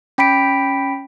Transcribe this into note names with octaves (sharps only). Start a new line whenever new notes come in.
C#4 G5 B5 B6 D7